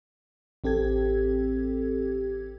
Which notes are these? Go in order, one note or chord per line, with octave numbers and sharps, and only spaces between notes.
A1 C4 G4 A4 G#6